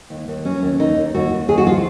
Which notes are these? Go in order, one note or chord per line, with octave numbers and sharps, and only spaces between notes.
D#2
D#2
F#3 C#4
D#2
D#2 D#4
D#2
D#2 F#4
D#2
D#2 G#4
F#4
F3 F4